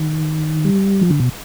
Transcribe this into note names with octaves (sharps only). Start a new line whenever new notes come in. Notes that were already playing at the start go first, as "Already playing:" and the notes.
Already playing: D#3
G3
F3
D3
B2